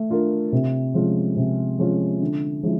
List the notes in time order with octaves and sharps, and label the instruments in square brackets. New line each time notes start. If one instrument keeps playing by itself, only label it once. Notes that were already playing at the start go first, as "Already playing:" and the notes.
Already playing: [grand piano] A3
D4 F4 A#4
C3
F3 G#3 C#4 F4
C3
F3 G#3 C#4 F4
D3
F3 G#3 C#4 E4